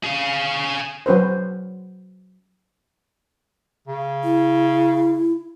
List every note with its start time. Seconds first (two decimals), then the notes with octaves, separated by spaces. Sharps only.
0.04 G#4 F5
1.06 F#3 C#4 B4 C5
3.87 C#3
4.24 E4